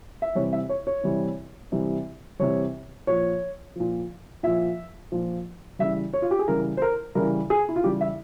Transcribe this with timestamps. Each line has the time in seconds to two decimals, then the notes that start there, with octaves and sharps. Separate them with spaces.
0.22 E5
0.35 C3 E3 G3 C#5
0.53 E5
0.69 C#5
0.87 C#5
1.04 C3 E3 G3
1.72 C3 E3 G3
2.39 C3 E3 G3 C#5
3.07 A#2 F3 C#5
3.76 A#2 F3
4.43 A#2 F3 E5
5.12 A#2 F3
5.79 C#3 E3 G3 E5
6.13 C#5
6.22 F4
6.31 G4
6.39 G#4
6.48 C#3 E3 G3 A#4
6.77 C5
6.82 A#4
7.15 C#3 E3 G3 A#4
7.50 G#4
7.69 E4
7.76 F4
7.84 C#3 E3 G3 G4
8.01 E5